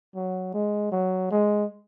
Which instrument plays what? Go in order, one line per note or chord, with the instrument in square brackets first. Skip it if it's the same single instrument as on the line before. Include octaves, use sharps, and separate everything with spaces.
[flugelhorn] F#3
G#3
F#3
G#3